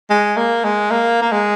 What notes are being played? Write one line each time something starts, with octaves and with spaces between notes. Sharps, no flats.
G#3
A#3
G#3
A#3
A#3
G#3